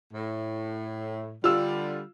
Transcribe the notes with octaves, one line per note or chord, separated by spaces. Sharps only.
A2
D3 G3 F4 E6